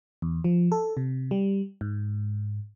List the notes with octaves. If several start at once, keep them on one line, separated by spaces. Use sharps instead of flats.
E2
F3
A4
C3
G3
G#2